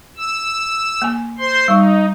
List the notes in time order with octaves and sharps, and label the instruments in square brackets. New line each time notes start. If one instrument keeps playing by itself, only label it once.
[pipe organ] E6
[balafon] A#3 G#5
[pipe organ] C5 C6
[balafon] G3 C#6 [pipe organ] D#4